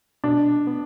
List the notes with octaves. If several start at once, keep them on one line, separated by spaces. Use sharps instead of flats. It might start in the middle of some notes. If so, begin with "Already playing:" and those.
B2 D4
B3